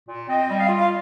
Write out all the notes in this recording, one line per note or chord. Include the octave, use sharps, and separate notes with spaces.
A#2
C4 D#5
G3
F5
F4
F5